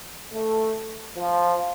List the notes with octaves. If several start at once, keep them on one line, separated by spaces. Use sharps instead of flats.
A3
F3